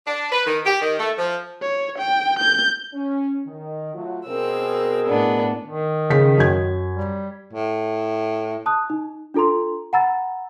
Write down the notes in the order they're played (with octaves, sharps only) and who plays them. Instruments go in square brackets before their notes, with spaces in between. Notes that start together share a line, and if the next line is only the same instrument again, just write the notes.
[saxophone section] D4
B4
D#3
G4
D#3
A3
F3
[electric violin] C#5
G5
G6
[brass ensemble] C#4
D#3
F#3 A3 F4
[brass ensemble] B2 G#4 A#4 [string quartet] C4 E6
[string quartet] A2 B3 D4
[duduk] D#3
[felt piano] C#3 B6
F#2 G#6
[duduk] G3
[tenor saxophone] A2
[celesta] A5 D#6 F#6
D#4
D4 F4 A4 A#5 C6
F#5 G#5 A#5 B5 E6 A6